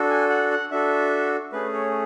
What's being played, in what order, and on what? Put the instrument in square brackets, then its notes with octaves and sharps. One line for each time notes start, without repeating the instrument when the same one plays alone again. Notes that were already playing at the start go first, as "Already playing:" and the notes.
Already playing: [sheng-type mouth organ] D4 F#4 A4
G#5
F#5
F#5
D4 F#4 A4 E5
A3 C#4 G#4 B4
C#5